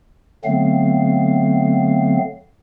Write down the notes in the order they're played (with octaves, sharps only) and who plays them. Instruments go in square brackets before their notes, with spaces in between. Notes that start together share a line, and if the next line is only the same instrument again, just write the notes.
[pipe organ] D3 F#3 A3 B3 C4 F5